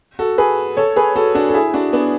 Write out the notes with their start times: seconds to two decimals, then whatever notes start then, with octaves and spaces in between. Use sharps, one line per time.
0.19 F#4 A4
0.38 G#4 B4
0.77 A4 C#5
0.96 G#4 B4
1.16 F#4 A4
1.35 D4 F#4
1.49 A4
1.54 E4 G#4
1.74 D4 F#4
1.93 B3 D4